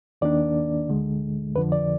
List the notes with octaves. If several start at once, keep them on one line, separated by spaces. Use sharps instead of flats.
D#2 D#3 A#3 D4 D5
D2 D3 G#3
F2 D3 F3 B4
D5